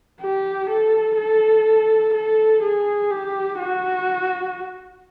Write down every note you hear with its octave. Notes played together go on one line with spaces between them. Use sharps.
G4
A4
A4
A4
G#4
G4
F#4